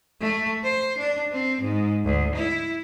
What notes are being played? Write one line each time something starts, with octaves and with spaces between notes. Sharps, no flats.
A3
C5
D4
C4
G#2
D2
E4